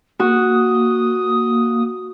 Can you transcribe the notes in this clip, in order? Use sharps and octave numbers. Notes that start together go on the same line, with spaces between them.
A#3 F#4 D#6